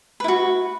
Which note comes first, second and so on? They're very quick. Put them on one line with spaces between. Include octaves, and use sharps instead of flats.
B4 E4 F#4